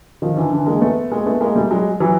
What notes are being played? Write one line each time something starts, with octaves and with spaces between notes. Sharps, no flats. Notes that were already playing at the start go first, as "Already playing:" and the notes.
D#3 F3
D3 E3
D3 E3
G#3 A#3
A3 B3
G#3 A#3
A3 B3
G#3 A#3
G3 A3
F#3 G#3
E3 F#3